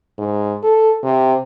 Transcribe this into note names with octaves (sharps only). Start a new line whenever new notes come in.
G#2
A4
C3